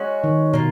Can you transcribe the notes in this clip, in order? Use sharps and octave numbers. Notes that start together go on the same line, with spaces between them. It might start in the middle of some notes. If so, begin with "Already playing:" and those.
Already playing: G#3 C#4 F#4
D#3
B2 A#3 F4